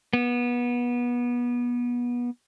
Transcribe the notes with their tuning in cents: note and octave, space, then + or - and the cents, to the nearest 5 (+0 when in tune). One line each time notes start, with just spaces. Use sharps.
B3 -25